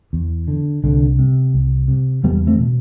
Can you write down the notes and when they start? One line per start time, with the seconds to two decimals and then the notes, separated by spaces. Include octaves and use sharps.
0.13 E2
0.48 D3
0.84 C2 D3
1.19 C3
1.54 C2
1.88 C3
2.24 E2 G3 B3
2.47 A3 C4
2.59 B2